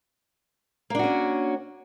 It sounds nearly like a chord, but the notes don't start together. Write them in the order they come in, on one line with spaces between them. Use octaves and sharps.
A#3 D4 F#4 C#4